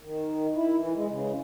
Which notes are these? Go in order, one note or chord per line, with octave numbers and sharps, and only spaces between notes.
D#3
E4
E3
G#3
C#3